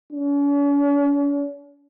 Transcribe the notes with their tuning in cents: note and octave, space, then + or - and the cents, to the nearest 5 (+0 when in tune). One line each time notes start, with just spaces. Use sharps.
C#4 +45